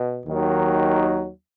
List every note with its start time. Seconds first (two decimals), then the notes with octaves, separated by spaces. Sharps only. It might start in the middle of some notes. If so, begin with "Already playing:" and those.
Already playing: B2
0.24 D#2 D#3 F#3